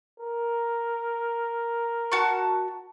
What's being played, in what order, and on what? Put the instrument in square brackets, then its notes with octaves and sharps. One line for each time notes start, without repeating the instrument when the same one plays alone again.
[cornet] A#4
[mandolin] F#4 A5 C#6